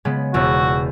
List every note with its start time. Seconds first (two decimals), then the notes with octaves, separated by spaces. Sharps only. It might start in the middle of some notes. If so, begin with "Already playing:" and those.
0.05 C#3 G#3 B3
0.34 E1 E2 F#4 E6